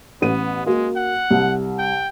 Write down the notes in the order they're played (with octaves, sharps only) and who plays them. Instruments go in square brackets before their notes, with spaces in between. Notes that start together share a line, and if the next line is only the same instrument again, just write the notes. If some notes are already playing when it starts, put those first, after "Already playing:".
[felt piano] A1 D#7 [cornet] B3
[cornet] G#3 [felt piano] A#3 F#4
[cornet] F#5
[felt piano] C2
[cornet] G5